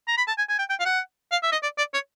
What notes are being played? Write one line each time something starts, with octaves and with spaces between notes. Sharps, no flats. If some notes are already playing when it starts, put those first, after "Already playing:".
A#5
B5
A5
G#5
G#5
G5
G5
F5
F#5
F5
E5
D#5
D5
D5
C#5